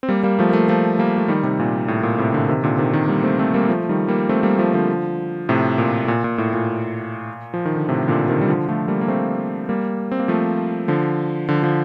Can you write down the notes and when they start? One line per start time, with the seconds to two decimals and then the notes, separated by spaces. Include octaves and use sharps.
0.03 C4
0.09 G3 A#3
0.23 G3 A#3
0.39 F3 A3
0.49 A#3
0.53 F3 A3
0.69 F3 A3
0.99 G3 A#3
1.18 A3
1.28 D#3 G3
1.43 C3 D#3
1.59 A#2
1.88 A2
2.03 A#2
2.18 A2 C3
2.34 A#2 D3
2.48 C3 D#3
2.63 A#2 D3
2.78 C3 D#3
2.93 C3 D#3
3.08 G3 A#3
3.23 A3 C4
3.39 A3 C4
3.54 G3 A#3
3.69 F3 A3
3.89 D#3 G3
4.08 G3 A#3
4.29 A3 C4
4.43 G3 A#3
4.59 F3 A3
4.74 D3 F3
5.49 A2 C3
5.78 A#2
6.04 A2
6.08 A#2
6.24 A#2
6.38 A2
6.54 A#2
7.54 F3
7.65 D#3
7.76 D3
7.89 A2 C3
8.08 A#2 D3
8.28 C3 D#3
8.41 G3
8.48 D3 F3
8.68 F3 A3
8.88 G3 A#3
9.01 A#3
9.08 A3 C4
9.69 G3 A#3
10.11 C4
10.19 A#3
10.28 F3 A3
10.88 D3 F3
11.48 D3 F3
11.63 D3 F3